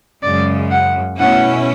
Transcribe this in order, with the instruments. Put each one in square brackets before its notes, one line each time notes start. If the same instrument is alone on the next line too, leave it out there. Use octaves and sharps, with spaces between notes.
[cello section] F#2 C#3 G#3 [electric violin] D5
[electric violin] F#5
[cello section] B2 A3 C#4 E4 [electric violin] F#5